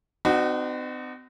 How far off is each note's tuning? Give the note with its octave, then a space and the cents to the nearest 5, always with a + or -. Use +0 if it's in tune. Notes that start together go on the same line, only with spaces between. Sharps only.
C4 -45 D#4 -40 F#4 +0